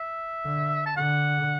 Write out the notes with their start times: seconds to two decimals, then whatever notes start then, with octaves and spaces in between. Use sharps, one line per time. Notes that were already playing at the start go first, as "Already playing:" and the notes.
Already playing: E5
0.45 D3
0.86 A5
0.96 D3 F#5